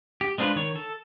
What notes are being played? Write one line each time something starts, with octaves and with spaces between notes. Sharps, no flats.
G4
G#3 C4 D4 F4 B4
D#3 C#5
A4